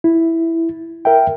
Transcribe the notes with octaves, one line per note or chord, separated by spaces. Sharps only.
E4
A#4 E5 G5